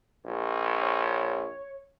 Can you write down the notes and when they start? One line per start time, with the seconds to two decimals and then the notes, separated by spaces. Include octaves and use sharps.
0.25 A#1
0.82 C#5